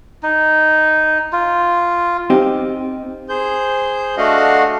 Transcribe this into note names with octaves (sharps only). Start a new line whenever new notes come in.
D#4
F4
C4 D#4 G4
G#4 C5 G6
A3 D4 F#4 D#5 F5 F#5